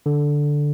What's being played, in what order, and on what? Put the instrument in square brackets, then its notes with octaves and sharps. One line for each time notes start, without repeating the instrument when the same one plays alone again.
[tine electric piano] D3